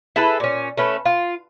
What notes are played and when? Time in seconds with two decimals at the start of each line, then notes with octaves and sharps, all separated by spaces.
0.16 E4 G#4 A4 B4
0.40 A#2 C#4
0.77 A3 C#4 B4
1.05 F4